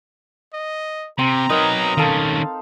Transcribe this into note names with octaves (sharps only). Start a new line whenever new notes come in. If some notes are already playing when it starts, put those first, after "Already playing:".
D#5
C3 C4 A#5
F#3 D#4 A#4 B4
D#3 C#4 A4 F5